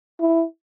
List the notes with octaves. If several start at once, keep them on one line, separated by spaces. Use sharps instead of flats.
E4